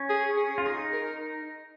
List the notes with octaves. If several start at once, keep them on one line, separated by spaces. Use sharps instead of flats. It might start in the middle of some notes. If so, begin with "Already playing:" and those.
Already playing: C#4
G#4
G#4
F4
D#4 G#4
A#4